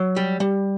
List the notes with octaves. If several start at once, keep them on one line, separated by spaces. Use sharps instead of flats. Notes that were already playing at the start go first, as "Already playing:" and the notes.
Already playing: F#3
G3
G3